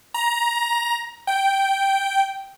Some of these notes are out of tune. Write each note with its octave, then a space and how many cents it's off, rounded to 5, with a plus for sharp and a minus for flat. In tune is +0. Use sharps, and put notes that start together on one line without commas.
A#5 +15
G5 -5